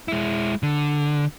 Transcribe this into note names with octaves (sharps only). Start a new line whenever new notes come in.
G#3 E4
D3